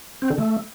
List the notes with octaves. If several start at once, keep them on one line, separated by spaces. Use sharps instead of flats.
C4
D3
A3